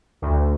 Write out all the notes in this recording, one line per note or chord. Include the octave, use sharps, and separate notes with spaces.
D2